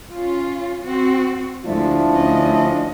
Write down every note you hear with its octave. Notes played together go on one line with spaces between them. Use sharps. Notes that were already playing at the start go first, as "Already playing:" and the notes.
C#4 F4
C4 F#4
D2 F3 G#3 A3 D4 E4
D2 C#4 D#5